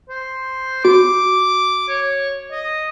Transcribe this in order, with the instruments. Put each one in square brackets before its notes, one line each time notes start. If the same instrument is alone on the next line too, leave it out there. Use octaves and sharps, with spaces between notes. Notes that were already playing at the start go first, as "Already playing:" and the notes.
[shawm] C5
[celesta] F#4 [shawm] D6
[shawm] C#5
D#5